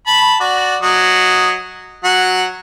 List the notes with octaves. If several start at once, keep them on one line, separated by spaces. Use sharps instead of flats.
A5 B5
F#4 D5
F#3 D#5
F#3 F#5